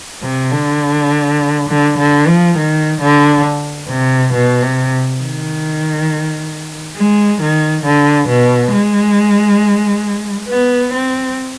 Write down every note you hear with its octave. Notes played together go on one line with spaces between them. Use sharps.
C3
D3
D3
D3
F3
D#3
D3
C3
B2
C3
D#3
G#3
D#3
D3
B2
G#3
B3
C4